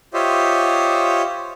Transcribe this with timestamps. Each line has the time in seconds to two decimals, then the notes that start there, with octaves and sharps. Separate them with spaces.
0.14 F4 G4 C5 C#5 D#5 E5